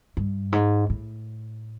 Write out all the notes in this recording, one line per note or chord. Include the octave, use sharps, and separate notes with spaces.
G2
G#2
A2